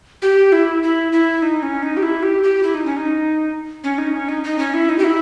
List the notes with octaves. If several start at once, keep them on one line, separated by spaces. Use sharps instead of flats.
G4
E4
E4
E4
D#4
C#4
D#4
G4
E4
G4
G4
E4
D#4
C#4
D#4
C#4
D#4
C#4
D#4
D#4
C#4
E4
D#4
G4
E4